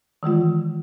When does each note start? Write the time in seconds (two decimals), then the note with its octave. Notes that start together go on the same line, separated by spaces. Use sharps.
0.23 D#3 E3 G#3 F4